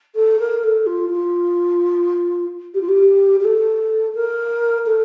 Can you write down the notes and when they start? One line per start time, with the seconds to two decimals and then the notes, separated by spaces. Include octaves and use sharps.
0.15 A4
0.39 A#4
0.63 A4
0.86 F4
1.10 F4
2.74 G4
2.81 F4
2.89 G4
3.40 G4
3.45 A4
4.15 A#4
4.86 A4